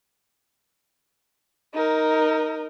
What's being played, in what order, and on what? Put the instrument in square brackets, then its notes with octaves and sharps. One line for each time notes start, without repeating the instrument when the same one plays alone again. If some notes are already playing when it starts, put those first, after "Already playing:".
[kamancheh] D#4 A#4